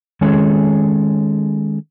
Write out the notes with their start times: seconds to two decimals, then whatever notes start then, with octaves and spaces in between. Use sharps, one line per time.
0.21 D#3 G#3 C#4 G#4 A4 C#5